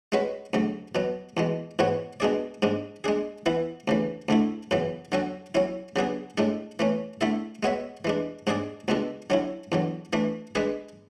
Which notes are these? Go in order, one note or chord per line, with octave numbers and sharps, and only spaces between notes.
G#3 C#4 F#4 B4
D2 C#3 F#3
B2 F#3 B3
E2 B2 G#3
G#2 E3 B3 F#4 C#5
B2 G#3 D4 G#4 D5
G#2 G#3 D4
G#3 D4 G#4
E3 B3 E4
D2 C#3 E3
D2 D3 A3 E4
F#2 C#3 E3 B3
D3 F#3 C#4 F#4 A4
F#3 C#4 E4
C#3 F#3 B3 D4 G#4
A2 G#3 D4 A4
E3 A3 C#4
D3 A3 E4 A4 E5
G#3 B3 F#4 C#5 E5
E3 G#3 D4
G#2 G#3 D4 G#4 D5
C#2 B2 G#3 D4 A4
D3 F#3 C#4 E4
E2 D3 F#3
E3 A3 D4
G#3 D4 G#4 B4